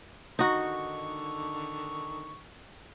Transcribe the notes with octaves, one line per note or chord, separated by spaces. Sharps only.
D3 D#3 D#4 F#4 C#6